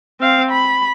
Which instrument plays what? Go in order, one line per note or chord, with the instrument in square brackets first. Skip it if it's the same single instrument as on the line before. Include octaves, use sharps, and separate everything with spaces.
[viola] C4 F5
B5